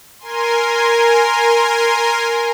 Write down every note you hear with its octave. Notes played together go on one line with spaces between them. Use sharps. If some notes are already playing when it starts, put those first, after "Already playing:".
A#4 G#5 C6